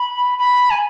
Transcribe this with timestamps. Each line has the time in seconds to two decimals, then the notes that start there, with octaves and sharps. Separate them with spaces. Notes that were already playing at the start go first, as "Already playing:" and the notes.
Already playing: B5
0.38 B5
0.71 G#5